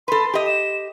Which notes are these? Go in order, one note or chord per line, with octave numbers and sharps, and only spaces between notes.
A4 B4 C6
G4 D#5
E7